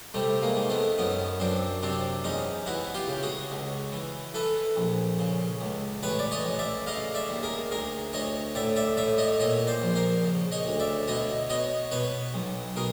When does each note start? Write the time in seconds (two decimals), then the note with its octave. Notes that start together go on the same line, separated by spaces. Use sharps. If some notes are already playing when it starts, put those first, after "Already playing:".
0.14 C3 G3 A3
0.42 G#3 A#3
0.56 D#3
0.69 A3 B3
0.98 F#2 B3 C#4
1.40 F#2 C4 D4
1.82 C3 C4 D4
2.24 E2 C#4 D#4
2.66 E3 E4 F#4
2.94 F4 G4
3.08 C#3
3.23 F#4 G#4
3.51 C#2
3.92 E3
4.34 E3 A4 B4
4.76 A#1
5.19 C#3
5.61 C#2
6.03 A1 B4 C#5
6.19 D5
6.31 C#5 D#5
6.45 A1
6.59 D5 E5
6.87 C#3 D#5 F5
7.15 D5 E5
7.30 D#2
7.43 G#4 A#4
7.71 D2 G#4 A#4
8.13 D2 C#5 D#5
8.55 A2 D5 E5
8.76 D5 E5
8.97 A2 D5 E5
9.18 C#5 D#5
9.40 A#2 C#5 D#5
9.67 C5 D5
9.82 A#1
9.96 A#4 C5
10.23 C#3
10.52 C#5 D#5
10.65 D2
10.80 D5 E5
11.08 B2 C#5 D#5
11.50 B2 C#5 D#5
11.91 B2 B4 C#5
12.34 B1
12.76 B2 G#4 A#4